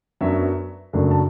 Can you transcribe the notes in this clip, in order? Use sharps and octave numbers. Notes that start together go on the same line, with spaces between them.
F#2 F#3 B3 D4 E5
F#1 F#2 F#3 A3 D4
A5